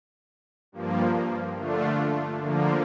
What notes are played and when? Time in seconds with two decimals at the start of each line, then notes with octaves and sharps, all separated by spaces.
0.72 G2 F3 A#3
1.56 D3 A3 D4 F4
2.41 D3 F3 A#3